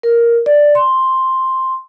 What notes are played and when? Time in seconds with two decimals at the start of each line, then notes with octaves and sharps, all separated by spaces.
0.03 A#4
0.46 D5
0.75 C6